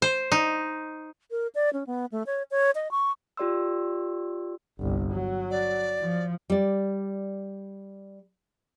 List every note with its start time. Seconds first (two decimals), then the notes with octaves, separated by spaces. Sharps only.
0.02 C5
0.32 D#4
1.31 A#4
1.55 D5
1.73 C#4
1.87 B3
2.12 A3
2.26 C#5
2.51 C#5
2.75 D#5
2.91 C#6
3.37 F4 G4 D5 C6 E6
4.79 G1 C2
5.12 F#3
5.51 D5
6.02 F3
6.50 G3 D5